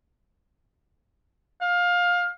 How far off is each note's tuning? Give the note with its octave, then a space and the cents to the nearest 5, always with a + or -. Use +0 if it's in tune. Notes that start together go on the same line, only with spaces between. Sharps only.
F5 +20